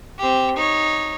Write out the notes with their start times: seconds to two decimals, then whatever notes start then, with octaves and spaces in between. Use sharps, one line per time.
0.19 C4 G4
0.57 D#4 C#5